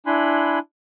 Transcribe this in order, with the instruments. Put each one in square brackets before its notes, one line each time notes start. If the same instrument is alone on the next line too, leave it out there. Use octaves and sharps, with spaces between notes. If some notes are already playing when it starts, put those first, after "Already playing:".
[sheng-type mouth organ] D4 E4 G#5 B5 C6 F#6